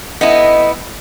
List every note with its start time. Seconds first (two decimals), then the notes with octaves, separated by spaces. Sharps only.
0.21 B3 D#4 E4 A4 D#5